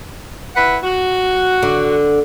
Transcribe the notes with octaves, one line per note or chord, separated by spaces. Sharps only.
E4 B4 F#5
F#4
D3